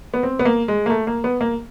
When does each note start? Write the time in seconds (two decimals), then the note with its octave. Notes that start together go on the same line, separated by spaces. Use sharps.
0.14 B3
0.23 C4
0.39 B3
0.45 A#3
0.68 G#3
0.86 A#3
0.90 A3
1.07 A#3
1.24 B3
1.41 A#3